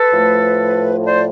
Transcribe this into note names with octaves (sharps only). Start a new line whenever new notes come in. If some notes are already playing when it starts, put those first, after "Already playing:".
Already playing: A4 B4
A2 F3 A3
C5 D5